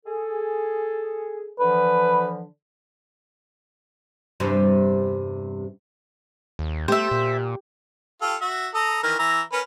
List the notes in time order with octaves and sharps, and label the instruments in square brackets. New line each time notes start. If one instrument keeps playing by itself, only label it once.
[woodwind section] G#4 A4
[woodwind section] D3 E3 F3 [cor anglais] B4
[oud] E2 G2 C3
[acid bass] D#2
[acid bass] A3 [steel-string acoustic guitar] G4 [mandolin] C5 E5
[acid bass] A#2
[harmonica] F4 G4 A4
F#4 E5
A4 A#5 D#6
D#3 E3 A#4
E3 E5 A#5
C#4 A#4 B4